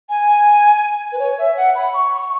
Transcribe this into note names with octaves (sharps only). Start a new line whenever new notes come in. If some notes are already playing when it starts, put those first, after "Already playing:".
G#5
B4
C#5
E5
F#5
B5
C#6
C#6